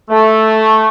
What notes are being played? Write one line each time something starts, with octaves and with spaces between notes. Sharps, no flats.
A3